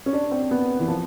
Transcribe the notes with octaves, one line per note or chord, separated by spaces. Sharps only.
C#4
D4
C4
B3
E3
F3